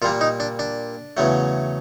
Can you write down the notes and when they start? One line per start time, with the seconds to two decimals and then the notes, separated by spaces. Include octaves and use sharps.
0.02 A#2 G3 A#3 F4
0.21 D#4
0.40 D4
0.59 D4
1.17 E2 C#3 F#3 A3